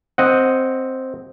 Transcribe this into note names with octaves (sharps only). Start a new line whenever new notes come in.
C4 D#5 F#5